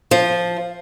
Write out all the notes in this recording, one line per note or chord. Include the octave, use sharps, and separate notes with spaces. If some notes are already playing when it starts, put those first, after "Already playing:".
F3